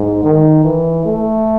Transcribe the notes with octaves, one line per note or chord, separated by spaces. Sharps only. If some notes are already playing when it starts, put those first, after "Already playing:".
Already playing: G#2
D#3
E3
A3